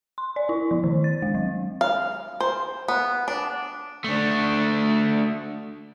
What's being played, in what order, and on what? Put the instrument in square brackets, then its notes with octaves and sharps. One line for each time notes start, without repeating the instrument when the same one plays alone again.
[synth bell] C6
D5
E4
F3
D#3
A6
G#3
F#3
[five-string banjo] F5
C5
B3
D4
[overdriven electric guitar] A3 D4